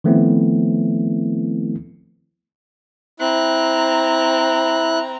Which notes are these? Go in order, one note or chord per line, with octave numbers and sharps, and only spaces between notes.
D#3 F3 A3 B3 C4 E4
C4 E4 A#5 F#6